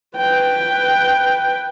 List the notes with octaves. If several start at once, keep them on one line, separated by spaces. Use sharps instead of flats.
B4 G5